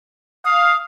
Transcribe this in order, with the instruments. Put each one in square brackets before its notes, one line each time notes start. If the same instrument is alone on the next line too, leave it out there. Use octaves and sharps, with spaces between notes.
[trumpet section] F5 [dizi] D#6